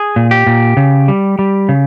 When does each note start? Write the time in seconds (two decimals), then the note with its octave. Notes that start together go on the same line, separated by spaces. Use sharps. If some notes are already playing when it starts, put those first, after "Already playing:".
Already playing: G#4
0.16 A#2
0.31 G4
0.47 A#2
0.77 C#3
1.08 G3
1.39 G3
1.69 C#3